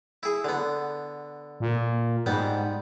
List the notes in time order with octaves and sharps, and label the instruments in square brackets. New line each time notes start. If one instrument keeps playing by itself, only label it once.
[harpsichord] E4 G#4
D3 B3
[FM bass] A#2
[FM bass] G#2 [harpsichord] G3 B3